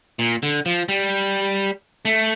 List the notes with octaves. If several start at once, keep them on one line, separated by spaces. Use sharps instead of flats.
A#2
D3
F3
G3
A3